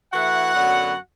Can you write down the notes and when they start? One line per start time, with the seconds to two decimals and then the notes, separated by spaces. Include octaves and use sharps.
0.13 E3 A3 E4 F#4 F#5
0.54 F#2 D3 F#3 B3